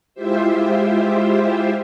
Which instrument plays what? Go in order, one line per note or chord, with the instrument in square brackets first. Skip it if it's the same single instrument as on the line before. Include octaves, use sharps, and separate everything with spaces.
[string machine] G#3 E4 F4 G4 C5 E5